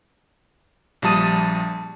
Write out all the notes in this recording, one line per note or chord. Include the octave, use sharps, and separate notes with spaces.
A#1 F3 G3 A5 D#6 D#7